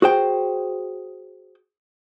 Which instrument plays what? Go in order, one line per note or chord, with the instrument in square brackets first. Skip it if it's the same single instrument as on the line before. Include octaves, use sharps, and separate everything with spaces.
[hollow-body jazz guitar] F#4 G#4 C5 G5